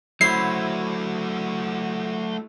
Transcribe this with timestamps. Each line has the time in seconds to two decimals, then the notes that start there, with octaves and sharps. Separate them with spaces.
0.21 F#3 A3 E4 F#4 C5 C7